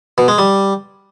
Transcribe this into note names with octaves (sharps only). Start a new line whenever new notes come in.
B2
G#3
G3